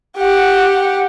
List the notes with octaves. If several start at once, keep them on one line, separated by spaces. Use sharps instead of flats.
G4 F#5